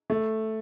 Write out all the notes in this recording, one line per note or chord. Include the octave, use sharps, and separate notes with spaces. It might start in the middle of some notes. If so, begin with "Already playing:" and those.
A3